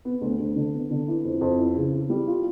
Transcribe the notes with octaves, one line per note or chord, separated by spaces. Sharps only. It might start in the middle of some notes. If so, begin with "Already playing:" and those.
B3
D2
D2
D3
B3
D3
E3
F2
F2
E3
C#3
E3
G3
F4